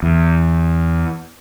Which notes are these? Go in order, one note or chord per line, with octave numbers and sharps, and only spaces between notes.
E2